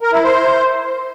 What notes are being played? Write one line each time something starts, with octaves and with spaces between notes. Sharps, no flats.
A#4
E4
C5